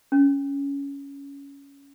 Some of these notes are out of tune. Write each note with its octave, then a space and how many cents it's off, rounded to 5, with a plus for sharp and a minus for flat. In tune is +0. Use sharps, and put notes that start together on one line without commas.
C#4 +15